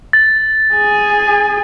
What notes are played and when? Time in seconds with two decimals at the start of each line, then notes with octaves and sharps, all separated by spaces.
0.13 A6
0.74 G#4 G#5